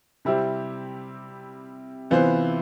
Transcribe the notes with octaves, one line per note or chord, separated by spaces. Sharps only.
C3 G3 C4 E4 G4
C3 E3 B3 F4 C5